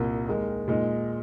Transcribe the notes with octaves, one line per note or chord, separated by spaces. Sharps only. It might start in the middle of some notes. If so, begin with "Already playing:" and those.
Already playing: C2 A#2 A#3
D#2 D#3 G#3
A#2 G#3 D#4